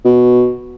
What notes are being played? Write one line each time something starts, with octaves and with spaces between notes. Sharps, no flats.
B2